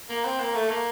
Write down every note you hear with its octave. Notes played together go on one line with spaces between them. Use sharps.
A#3
C4
A#3
A3
A#3